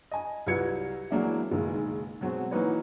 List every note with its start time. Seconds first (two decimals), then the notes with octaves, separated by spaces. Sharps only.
0.11 D#5 G#5
0.47 C2 F#3 F4 B4 G#6 C#7
1.11 E3 F#3 G#3 A#3 D4 E4
1.51 F#1 B1 D#3 G#3 F5
2.21 B2 F#3 G#3 C4 F#4
2.51 E3 F#3 A#3 D#4 B4 C#5